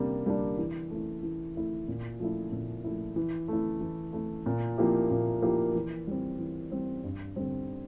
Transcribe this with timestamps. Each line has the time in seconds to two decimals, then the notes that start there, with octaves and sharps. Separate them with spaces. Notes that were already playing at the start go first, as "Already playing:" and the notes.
Already playing: C3 G3 A#3 D4
0.26 G3 A#3 D4
0.58 E3
0.90 A3
0.95 E4
1.23 E3
1.56 A3 E4
1.88 A#2
2.20 F3 A3 E4
2.52 A#2
2.84 F3 A3 E4
3.16 E3
3.48 A3 E4
3.81 E3
4.13 A3 E4
4.46 A#2
4.78 F3 A#3 E4 G4
5.11 A#2
5.42 F3 A#3 E4 G4
5.74 E3
6.07 G3 C4
6.39 E3
6.72 G3 C4
7.04 G2
7.36 D3 G3 C4